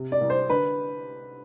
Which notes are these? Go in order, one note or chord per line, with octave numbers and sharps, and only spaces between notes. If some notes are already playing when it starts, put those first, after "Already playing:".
Already playing: C3
D5
C2
C5
D3 B4